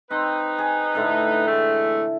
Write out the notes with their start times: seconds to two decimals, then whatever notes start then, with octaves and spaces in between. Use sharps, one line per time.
0.11 C4 D#4 B4
0.58 G#4
0.95 A2 D3 E4
1.48 E3 G#3 A3